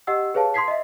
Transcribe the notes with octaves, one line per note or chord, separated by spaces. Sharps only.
G4 D#5 F#5 E6
G#4 B4 C#5 F5 A5
C6 D#6 G#6 B6 C7
D#5 E5